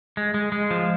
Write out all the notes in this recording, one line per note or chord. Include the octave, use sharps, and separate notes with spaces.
G#3
G#3
G#3
F3